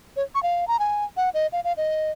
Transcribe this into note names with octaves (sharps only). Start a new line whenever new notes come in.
C#5
C#6
F5
A#5
G#5
F#5
D#5
F5
F5
D#5